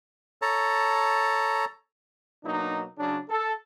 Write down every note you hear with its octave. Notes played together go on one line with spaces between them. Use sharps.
A4 C#5 A5 A#5
B2 F#3 A#3 D4 D#4
C#3 F#3 D4
A4